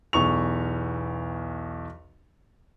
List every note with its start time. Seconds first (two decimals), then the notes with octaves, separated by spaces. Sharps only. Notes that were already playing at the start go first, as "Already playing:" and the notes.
0.13 B1 E2 C#6 F7